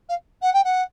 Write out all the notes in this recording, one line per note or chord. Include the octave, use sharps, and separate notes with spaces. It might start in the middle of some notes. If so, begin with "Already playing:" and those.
F5
F#5
G5
F#5